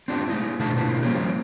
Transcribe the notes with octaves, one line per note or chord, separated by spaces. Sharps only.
C4 D4 F4 G4
A3 D#4 E4
B2 D3 E3 F4 G#4 A5
B2 D3 A#3 E4 F4
F3 G3 A#3 C#4 F4 G4